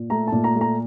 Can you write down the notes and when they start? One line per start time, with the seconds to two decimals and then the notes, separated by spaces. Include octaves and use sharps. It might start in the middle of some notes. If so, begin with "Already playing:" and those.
Already playing: A#2
0.10 A3 A#5
0.27 A5
0.32 A#2
0.44 A#5
0.56 A3
0.61 A#5